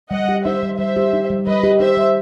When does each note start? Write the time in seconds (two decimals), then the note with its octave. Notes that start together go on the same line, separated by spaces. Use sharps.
0.11 G3 D#5 F#5
0.29 G4
0.45 D#4 C5 E5
0.63 G3
0.78 G3 C5 E5
0.97 G4
1.13 D#4
1.30 G3
1.47 G3 B4 D#5
1.64 G4
1.80 D#4 C5 E5
1.97 G3